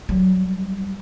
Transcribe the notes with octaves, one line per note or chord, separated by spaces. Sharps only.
F#3 G3